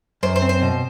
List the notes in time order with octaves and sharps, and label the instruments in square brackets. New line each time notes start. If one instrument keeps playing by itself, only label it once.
[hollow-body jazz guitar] F#2 [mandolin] C5
[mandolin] C5
[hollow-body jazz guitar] C4
[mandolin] C5
[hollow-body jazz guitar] B2